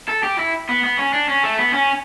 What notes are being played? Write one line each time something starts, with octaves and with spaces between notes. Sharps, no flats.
A4
G4
E4
B3
B3
C#4
D4
C#4
A3
B3
C#4